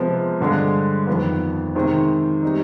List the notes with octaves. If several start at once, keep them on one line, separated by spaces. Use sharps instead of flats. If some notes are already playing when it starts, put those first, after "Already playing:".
Already playing: C3 F3 G#3 B3
G2 D3 G#3
F2 D#3 B3
C3 D#3 G#3 C4
G3 C4 D#4